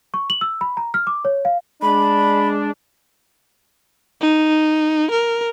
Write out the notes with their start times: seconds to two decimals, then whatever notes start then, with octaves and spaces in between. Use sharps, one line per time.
0.14 C#6
0.30 F#7
0.41 E6
0.61 B5
0.77 A#5
0.94 F6
1.07 D6
1.25 C#5
1.45 F5
1.82 G#3 D4 B5
4.21 D#4
5.11 A#4